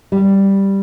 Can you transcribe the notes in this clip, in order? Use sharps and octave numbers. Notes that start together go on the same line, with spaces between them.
G3